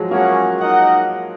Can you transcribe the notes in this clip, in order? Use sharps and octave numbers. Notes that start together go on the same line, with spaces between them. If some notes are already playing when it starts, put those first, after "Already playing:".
Already playing: F3 F#3 G#3
A#3 C#4 G#4 C#5 F#5
D#4 A#4 D#5 F#5